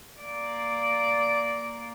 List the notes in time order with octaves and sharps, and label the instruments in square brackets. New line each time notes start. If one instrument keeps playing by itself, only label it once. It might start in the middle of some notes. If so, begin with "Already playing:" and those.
[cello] A#3 D5